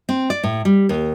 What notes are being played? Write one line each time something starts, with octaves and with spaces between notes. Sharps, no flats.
C4
D5
A2
G3
D#2